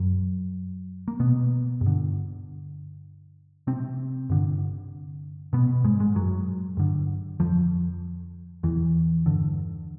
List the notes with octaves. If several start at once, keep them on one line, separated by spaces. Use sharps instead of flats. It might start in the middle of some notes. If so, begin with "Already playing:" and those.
Already playing: F#2 F#3
A#3
B2 B3
G2
D3
C3 C4
G2 D3
B2 B3
G#2 G#3
G#2 G#3
F#2 F#3
G2 D3
F2 F3
E2 E3
G2 D3